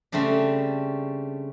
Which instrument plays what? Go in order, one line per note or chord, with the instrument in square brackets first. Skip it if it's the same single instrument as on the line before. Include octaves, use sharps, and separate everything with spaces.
[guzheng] C#3 G3 A3 C4 D4